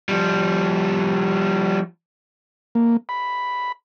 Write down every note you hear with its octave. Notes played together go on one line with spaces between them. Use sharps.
F3 G3
A#3
B5